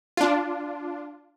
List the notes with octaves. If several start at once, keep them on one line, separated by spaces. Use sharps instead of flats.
D4 F4